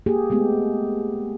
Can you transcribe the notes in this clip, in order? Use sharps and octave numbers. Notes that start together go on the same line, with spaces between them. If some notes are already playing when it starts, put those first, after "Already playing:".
A#3 G4 G#4
G#3 A3 B3 G4